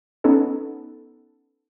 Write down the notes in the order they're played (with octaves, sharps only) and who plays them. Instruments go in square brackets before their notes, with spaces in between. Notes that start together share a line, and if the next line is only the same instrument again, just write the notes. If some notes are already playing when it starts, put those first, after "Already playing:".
[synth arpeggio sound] B3 C#4 D#4 A4